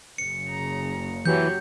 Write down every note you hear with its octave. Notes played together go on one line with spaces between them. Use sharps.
F#1 C#3 C#7
A#5
E3 F#3 G4 G6